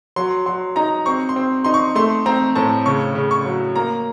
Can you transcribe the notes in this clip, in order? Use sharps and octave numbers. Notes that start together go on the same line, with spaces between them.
F#3 C6
F#3 C6
D#4 A#5
C4 C#6
C6
C4
D#4 C6
C#6
A3 C6
C4 A#5
A2 A5
C#3 C#6
C#3
C#6
F#3
A#3 A#5